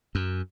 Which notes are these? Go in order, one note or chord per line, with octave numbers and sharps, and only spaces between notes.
F#2